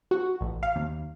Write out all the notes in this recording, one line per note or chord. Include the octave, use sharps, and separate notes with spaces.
F#4
A1
F5
D#2